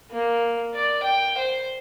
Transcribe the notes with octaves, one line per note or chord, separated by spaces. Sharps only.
A#3
D5
G5
C5